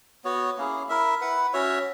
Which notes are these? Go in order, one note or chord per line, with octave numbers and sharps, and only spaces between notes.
B3 F#4 C#5
A#3 C#4 E4 G#4
E4 A#4 E5
E4 B4 F#5
C#4 F#4 C#5 E5